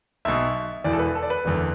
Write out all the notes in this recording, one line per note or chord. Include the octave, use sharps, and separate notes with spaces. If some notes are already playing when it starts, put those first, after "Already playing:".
B1 B2 E5
E1 E2 E3 D5
A4
B4
A4
D5
B4
F#1 E2 D3